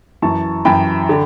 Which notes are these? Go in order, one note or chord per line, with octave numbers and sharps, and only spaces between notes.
F#2 E3 A5 C#6
F#2 E3 G5 B5
D3